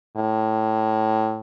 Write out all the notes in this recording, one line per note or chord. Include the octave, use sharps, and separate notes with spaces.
A2